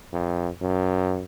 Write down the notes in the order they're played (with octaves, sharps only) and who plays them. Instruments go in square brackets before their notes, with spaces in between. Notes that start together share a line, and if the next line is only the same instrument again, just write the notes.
[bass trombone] F2
F#2